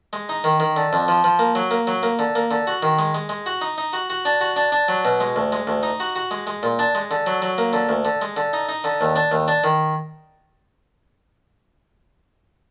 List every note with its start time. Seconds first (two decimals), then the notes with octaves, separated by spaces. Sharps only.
0.13 G#3
0.29 D#4
0.44 D#3
0.60 D#3
0.76 D3
0.93 F2
1.08 F3
1.24 F3
1.39 A#3
1.55 F#3
1.71 A#3
1.87 F#3
2.03 A#3
2.19 D3
2.35 A#3
2.51 D3
2.67 F#4
2.83 D#3
2.99 G#3
3.15 G#3
3.29 G#3
3.46 F#4
3.61 D#4
3.78 D#4
3.93 F#4
4.10 F#4
4.25 D4
4.41 F#4
4.56 D4
4.72 D4
4.88 F#3
5.05 B2
5.20 G#3
5.36 D2
5.52 G#3
5.67 D2
5.83 D#4
6.00 F#4
6.16 F#4
6.31 G#3
6.47 G#3
6.63 A#2
6.79 D4
6.95 G#3
7.11 D3
7.26 F#3
7.42 F#3
7.58 A#3
7.73 D3
7.89 D2
8.05 D3
8.22 G#3
8.37 D3
8.53 D#4
8.69 D#4
8.84 D3
9.01 D#2
9.16 D4
9.31 D#2
9.48 D4
9.64 D#3